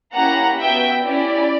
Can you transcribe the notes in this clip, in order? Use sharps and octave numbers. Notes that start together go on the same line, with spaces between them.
A#3 C#4 E4 G4 F#5 A#5
B3 F#4 E5 G5
C#4 E4 G4 D5